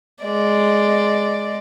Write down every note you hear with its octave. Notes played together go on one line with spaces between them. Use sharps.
G#3 D5